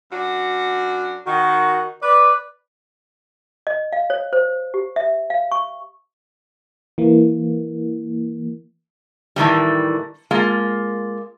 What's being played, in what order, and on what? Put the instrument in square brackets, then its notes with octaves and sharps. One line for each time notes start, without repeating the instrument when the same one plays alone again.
[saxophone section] F#2 D4 F#4
[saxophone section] D#3 [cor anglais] F#4
[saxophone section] B4 [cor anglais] D5
[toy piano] D#5
F5
C#5
C5
G4
E5
F5
C#6
[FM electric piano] E3 A#3
[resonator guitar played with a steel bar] A2 D#3 E3 G3
G#3 A#3 F4